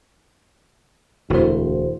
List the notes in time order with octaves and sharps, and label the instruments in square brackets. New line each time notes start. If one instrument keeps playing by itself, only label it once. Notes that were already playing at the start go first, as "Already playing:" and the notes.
[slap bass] E1 [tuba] D2 [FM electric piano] E4 F#4 C5